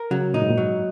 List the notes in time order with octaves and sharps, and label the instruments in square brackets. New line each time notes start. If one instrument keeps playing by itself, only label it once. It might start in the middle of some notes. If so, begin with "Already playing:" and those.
Already playing: [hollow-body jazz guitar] A#4
[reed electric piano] C#3 [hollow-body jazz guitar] F#3
[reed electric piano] A#2 [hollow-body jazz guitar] D#4
[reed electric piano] G#2
A#2
[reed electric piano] G#2 [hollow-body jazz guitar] F#3